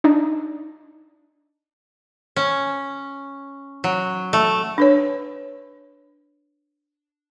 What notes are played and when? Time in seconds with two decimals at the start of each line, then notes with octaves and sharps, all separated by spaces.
0.04 D4 D#4
2.36 C#4
3.84 F#3
4.33 A3
4.78 D4 B4 C#5